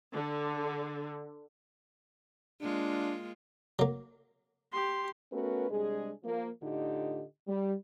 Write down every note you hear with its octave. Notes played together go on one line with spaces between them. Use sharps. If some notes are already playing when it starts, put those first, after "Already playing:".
D3
G#3 A#3 D4 F4
F#3 A#3
G4 C6
A3 B3 C#4 F#4 A#4 B4
C3 G3 G#3 D4 G#4
F3 A#3
A2 D3 D#4 F4 G4 D#5
G3